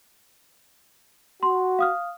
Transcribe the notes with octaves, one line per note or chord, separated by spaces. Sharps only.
F#4 C6
F5 D#6 F6